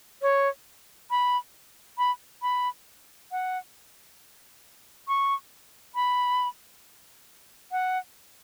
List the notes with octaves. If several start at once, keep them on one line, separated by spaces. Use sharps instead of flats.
C#5
B5
B5
B5
F#5
C#6
B5
F#5